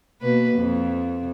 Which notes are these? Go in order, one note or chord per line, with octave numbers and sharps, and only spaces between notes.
B2 A#3 B4
F2